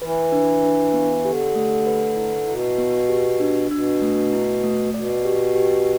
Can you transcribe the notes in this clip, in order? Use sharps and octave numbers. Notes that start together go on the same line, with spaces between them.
E3 B4
D4
D4
B3
D3 G4
A3
B4
E4
B2 E4
B3
G4
D4
B2 D4
A3
E4
A3
B2 D5
G4
G4